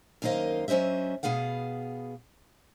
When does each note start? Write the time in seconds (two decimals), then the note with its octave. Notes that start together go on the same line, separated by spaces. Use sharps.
0.22 F#2 D#3 A#3 C5 D#5 F5
0.68 F#3 C#4 C5 D#5 E5
1.23 B2 F3 B3 G#4 F5 F#5